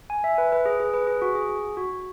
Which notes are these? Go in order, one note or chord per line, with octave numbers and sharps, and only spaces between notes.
G#5
E5
B4
B4
G#4
G#4
B4
G#4
F#4
G#4
F#4